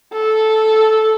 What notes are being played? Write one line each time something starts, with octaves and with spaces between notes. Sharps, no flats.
A4